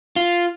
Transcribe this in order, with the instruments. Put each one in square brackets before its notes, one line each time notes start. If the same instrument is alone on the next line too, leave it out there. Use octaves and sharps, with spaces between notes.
[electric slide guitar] F4